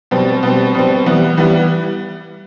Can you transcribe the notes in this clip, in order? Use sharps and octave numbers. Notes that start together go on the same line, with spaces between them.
B2 G3 C4
B2 G3 C4
B2 G3 C4
E3 G3 B3
E3 G3 B3